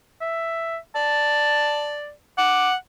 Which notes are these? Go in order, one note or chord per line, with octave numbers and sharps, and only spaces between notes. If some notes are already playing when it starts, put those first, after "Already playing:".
E5
D5 A5
F#5 D6